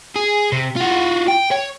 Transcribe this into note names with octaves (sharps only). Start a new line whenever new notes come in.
G#4
C3
F4 F#4
G5
C#5